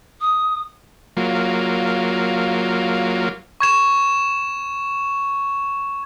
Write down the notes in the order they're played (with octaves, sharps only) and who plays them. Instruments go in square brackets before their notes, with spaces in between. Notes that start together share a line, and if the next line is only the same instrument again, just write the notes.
[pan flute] D#6
[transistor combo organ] F#3 A#3 F4
[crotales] C#6 G#6 E7